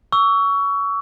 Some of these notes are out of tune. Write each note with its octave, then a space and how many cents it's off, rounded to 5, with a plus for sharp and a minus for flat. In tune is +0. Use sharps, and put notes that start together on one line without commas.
C#6 +25 E6 +0